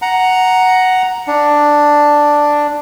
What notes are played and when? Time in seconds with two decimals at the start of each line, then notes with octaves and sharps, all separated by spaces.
0.02 F#5 A#5
1.27 D4